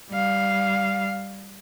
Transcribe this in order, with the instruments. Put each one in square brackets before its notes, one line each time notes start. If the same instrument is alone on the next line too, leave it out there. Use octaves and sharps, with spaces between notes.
[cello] G3 F5